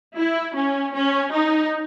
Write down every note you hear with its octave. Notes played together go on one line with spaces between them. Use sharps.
E4
C#4
C#4
D#4